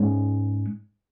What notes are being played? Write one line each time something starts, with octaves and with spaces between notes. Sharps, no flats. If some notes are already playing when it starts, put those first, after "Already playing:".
Already playing: G#2 G#3 C#4